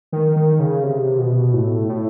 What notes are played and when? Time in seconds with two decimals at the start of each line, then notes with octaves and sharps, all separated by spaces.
0.12 D#3
0.36 D#3
0.59 C#3
0.84 C3
1.19 B2
1.53 A2
1.89 A2